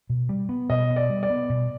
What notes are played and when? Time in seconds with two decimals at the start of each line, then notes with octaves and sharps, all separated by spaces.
0.10 B2
0.29 G3
0.49 B3
0.70 B2 D#5
0.90 B2
0.96 D5
1.10 G3
1.23 D5
1.30 B3
1.49 B2